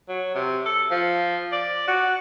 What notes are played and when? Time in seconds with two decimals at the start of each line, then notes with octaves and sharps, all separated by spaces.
0.09 F#3
0.35 C3
0.66 A4
0.91 F3
1.52 D5
1.87 F#4